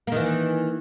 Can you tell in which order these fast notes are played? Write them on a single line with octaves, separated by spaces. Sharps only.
A#3 D#3 E3